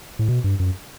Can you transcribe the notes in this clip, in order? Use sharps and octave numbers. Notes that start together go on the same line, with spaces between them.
A2
B2
G2
F#2